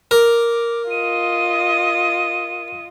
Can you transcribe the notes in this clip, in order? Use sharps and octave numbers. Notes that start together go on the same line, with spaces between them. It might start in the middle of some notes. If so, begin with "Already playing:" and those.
A#4 D6
F4 D#5 D#7